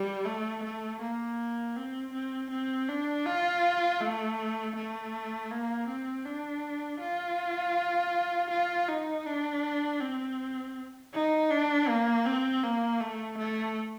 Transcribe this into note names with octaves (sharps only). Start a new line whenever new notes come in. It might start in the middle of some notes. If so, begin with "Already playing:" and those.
Already playing: G3
A3
A3
A#3
C4
C4
C4
D4
F4
A3
A3
A#3
C4
D4
F4
F4
D#4
D4
C4
D#4
D4
A#3
C4
A#3
A3
A3